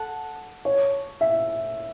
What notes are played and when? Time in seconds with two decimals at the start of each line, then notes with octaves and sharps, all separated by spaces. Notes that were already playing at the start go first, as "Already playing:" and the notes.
Already playing: A4 F#5
0.65 C#5
1.21 E5